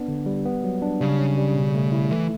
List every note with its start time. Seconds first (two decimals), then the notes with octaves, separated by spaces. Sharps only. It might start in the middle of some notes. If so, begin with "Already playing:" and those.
Already playing: B3 D4
0.08 D3
0.26 G3
0.45 B3
0.64 F#3
0.82 D4
1.01 C#3 G3
1.19 C#4
1.38 G3
1.55 B2
1.75 A3
1.92 E4
2.11 E3 A3